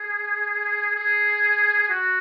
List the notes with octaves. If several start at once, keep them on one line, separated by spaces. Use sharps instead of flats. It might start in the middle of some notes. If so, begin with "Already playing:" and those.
Already playing: G#4
G#4
F#4